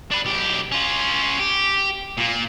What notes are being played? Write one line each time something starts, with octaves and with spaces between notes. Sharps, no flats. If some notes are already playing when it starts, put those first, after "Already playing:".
D4 B4
B1 G4
C#4 F4
G4
A#2 A#3